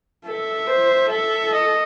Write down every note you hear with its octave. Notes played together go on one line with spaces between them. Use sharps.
A4 E5
C5
A4 E5
D#5